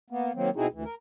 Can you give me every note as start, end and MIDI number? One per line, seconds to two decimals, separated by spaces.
0.10 0.32 58
0.10 0.32 59
0.35 0.50 51
0.35 0.50 54
0.35 0.50 58
0.35 0.50 60
0.56 0.67 47
0.56 0.67 60
0.56 0.67 63
0.56 0.67 64
0.56 0.67 66
0.56 0.67 68
0.73 0.84 38
0.73 0.84 52
0.85 0.95 70